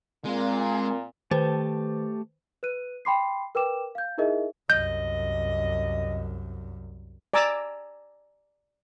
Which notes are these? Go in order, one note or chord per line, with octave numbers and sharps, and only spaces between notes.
A#2 G#3 C4 A#4
D#3 A3 G4 B4 C5 A5
B4 F#6 D#7
G5 B5 C6 D6 C7
A#4 B4 G5 D6 E7
F5 G6
D#4 E4 G#4 A#4 D#5 E5
C2 F#2 D#5 G6
D5 G#5 A#5 D6 E6